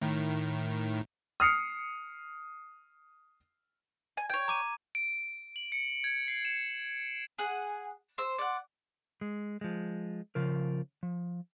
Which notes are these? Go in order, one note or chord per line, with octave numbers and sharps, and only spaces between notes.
A2 D#3
D#6 F6 C7 C#7
G#5
C#5 G5 G#6
A#5 D6 D#7
D7
F#7
C#7
G#6
C7
E7
G#4 F#5 G#5
C5 C6 E6
D5 F#5
G#3
F3 G#3
C#3 F3 A#4
F3